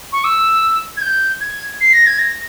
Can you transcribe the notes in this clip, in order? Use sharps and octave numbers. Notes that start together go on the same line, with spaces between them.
C#6
E6
G#6
G6
G#6
C7
A#6
G#6
A#6